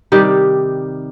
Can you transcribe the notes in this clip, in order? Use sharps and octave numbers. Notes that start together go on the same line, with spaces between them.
C3 D#3 G3 G4